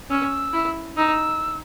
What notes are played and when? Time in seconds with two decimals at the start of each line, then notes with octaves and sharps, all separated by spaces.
0.10 C#4 E6
0.53 E4
0.97 D#4 E6